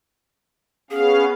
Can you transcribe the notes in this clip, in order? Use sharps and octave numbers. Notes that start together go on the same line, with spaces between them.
B3 C#4 G#4 F5